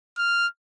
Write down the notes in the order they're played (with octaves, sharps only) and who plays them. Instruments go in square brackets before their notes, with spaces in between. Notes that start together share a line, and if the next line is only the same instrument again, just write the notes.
[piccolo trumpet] F6